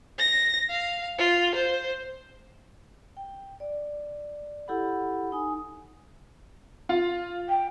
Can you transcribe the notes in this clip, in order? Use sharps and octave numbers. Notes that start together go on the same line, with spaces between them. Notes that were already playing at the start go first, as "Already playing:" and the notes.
A#6
F5
F4
C5
G5
D5
E4 G4 A4 F#5 B5
D#4 G#5 D#6
F4
G5